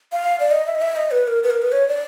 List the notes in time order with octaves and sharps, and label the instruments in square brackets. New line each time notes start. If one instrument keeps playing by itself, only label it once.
[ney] F5
D5
D#5
E5
D#5
E5
D#5
B4
A#4
B4
A#4
B4
C#5
D5